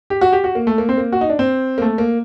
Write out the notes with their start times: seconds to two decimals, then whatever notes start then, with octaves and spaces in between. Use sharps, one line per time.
0.10 G4
0.21 F#4
0.33 G4
0.44 F#4
0.55 A#3
0.67 A3
0.78 A#3
0.89 C4
0.97 A#3
1.12 F#4
1.21 D#4
1.29 D4
1.39 C4
1.78 A#3
1.82 A3
1.98 A#3